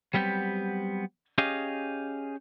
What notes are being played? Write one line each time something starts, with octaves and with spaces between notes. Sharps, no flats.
F#3 G3 B3 C4 G4
C#4 G4 G#4 D#5 F5